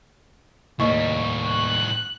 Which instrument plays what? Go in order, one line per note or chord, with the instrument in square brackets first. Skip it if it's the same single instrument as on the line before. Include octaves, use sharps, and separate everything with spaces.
[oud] D#2 [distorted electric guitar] A2 G3 [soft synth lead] C#6
[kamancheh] F#6